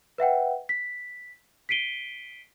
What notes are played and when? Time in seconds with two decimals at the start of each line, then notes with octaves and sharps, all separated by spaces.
0.18 B4 E5 F#5 G5
0.69 B6
1.69 B6 C7 D7 D#7 G7